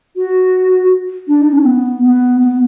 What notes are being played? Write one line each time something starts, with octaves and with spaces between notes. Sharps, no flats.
F#4
D4
D#4
C#4
B3
B3
B3